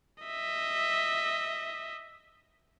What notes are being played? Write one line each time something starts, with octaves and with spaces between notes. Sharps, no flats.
D#5 E5